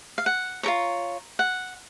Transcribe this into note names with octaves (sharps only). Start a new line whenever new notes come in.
F5
F#5
F4 A#4 C#5 A#5
F#5